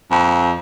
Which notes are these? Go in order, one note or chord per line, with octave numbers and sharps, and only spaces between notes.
F2